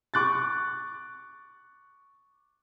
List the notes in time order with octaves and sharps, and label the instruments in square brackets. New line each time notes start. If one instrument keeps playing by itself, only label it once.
[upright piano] C#6 D6 F#6 A6